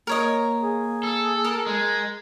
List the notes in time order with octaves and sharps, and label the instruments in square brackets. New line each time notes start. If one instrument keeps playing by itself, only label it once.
[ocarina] A#3 [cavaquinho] A#4 C#5 D#5
[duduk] G#4
[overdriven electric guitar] A4
[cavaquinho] A#4
[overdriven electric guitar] G#3